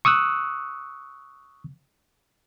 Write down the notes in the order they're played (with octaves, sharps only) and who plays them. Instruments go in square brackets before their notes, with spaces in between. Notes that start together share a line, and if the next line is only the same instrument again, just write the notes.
[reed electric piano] C#6 D#6 E6 F#6